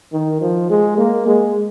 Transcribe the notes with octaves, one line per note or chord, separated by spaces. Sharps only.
D#3
F3
G#3
A#3
G#3